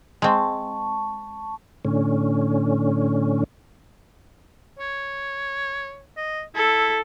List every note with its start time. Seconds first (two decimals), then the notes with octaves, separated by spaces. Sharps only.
0.22 G#3 C4 A5 C#6
1.85 A2 D3 C#4
4.79 C#5
6.17 D#5
6.55 E4 A4